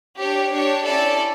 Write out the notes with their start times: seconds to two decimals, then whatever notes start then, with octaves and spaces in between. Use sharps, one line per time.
0.19 D4 G4 C#5
0.52 D4 G4 C#5
0.85 C#4 E4 A4 D5